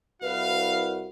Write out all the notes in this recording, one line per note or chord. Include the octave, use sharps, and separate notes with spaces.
C2 E4 F#4 B4 F5